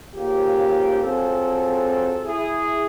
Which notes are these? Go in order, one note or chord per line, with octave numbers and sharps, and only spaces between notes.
D#2 G#2 C#3 A#3 F4 G4
F#3 C4 F4 G#4 A4
E4 G#4